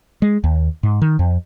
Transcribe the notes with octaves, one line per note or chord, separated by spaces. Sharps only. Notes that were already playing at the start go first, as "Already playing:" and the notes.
G#3
D#2
G#2
D#3
F2